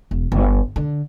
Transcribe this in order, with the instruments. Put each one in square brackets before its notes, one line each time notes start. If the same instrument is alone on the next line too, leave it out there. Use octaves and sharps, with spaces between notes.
[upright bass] E1
G1
D3